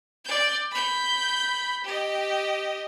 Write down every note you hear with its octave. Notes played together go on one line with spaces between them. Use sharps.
D5 G6
B5 G6
G4 D#5